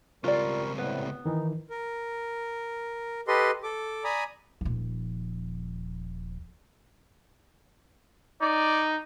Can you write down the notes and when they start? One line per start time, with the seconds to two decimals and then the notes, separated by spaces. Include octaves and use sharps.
0.24 C#2 G3 C4 F4 A#4 D5 C#6
0.78 A2 C3 G3 B3
1.25 D#3 E3 D#4
1.70 A#4
3.28 G4 A4 B4 D#5 C6
3.63 A4 D6
4.04 D5 G#5 A#5 B5 D#6
4.61 D#1 F3
8.41 D#4 D5